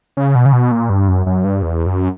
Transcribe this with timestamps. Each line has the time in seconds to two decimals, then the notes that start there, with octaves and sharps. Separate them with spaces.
0.17 C#3
0.35 B2
0.46 C#3
0.53 B2
0.72 A#2
0.90 G2
1.08 F#2
1.26 F#2
1.45 G2
1.63 E2
1.86 F#2